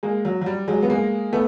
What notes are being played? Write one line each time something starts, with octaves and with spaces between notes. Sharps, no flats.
G#3 A#3
F#3
F#3
G3
F#3 G#3
B3
G#3 A#3
A3 B3